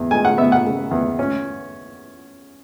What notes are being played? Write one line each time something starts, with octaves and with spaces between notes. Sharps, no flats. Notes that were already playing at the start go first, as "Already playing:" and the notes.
Already playing: E2
G#3 G#5
F#5
B3 E5
F#5
C#3
E2
C#4